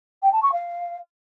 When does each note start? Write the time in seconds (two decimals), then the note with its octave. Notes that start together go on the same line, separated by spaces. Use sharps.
0.22 G5
0.32 A5
0.42 C#6
0.52 F5